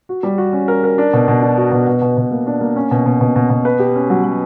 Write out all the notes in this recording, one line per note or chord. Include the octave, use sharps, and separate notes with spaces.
F#4
G3
F#4
C#4
A#4
A#4
D4
B2
B2
D4
F#4
B2
B2
B2
B2
A#3
D4
A#3
C#4
B2
B2
B2
B2
B2
B4
G4
C#4
F#3
F#3